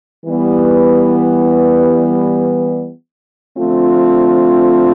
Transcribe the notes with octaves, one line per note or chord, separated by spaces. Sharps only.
E3 G3 B3
D3 F3 A3 C4 F4